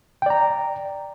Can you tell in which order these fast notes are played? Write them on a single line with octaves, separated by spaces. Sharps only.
G5 D5 A#5